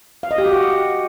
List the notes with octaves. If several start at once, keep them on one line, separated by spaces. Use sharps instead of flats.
F5
D#5
G4
F#4
F#5